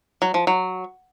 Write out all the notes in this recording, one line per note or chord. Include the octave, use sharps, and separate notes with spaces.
F#3
F3
F#3